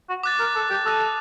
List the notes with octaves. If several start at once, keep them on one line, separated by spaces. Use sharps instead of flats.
F#4
D6 F#6 A6
A#4
A4
G4
A4 D#6 F#6 A#6 D#7